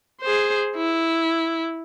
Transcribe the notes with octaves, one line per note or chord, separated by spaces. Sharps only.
G#4 C5
E4